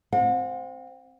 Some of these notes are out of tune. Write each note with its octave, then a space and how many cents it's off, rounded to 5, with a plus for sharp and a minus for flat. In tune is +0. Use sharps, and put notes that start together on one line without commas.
C4 +0 F#5 -45